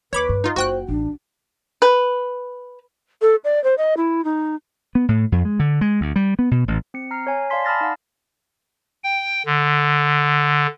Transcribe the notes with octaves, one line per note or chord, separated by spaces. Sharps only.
D#2 B4 C#5 B5 D6
G2
D#4 F4
F#1 F#4 C5 G5 F#6
A1 D4
B4
A4
D5
C5
D#5
E4
D#4
B3
A2
F2
G#3
D3
G#3
D2
G3
B3
B2
A1
C4 C#7
A#5 F6 C7
C#5 G#5
D5 F5 G#5 A5 C6 B6
A5 B5 D#6 F6 A6 A#6
D#4 D5 F5 F#5
G5
D3